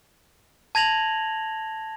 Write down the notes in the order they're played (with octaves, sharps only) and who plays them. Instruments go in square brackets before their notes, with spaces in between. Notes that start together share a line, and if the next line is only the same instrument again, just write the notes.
[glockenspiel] A5 G#6 A#6 F7 F#7